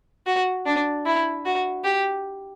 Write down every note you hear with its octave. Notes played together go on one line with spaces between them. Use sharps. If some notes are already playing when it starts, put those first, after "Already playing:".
F#4
D4
E4
F#4
G4